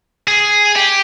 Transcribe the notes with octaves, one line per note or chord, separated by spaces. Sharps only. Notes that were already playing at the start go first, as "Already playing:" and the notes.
G#4
G4